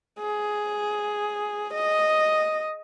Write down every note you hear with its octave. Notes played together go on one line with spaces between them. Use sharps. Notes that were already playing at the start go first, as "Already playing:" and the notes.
G#4
D#5